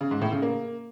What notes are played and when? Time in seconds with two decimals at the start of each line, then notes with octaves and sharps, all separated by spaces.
0.01 C#3
0.11 G#2
0.21 A2
0.32 C#3
0.42 A#3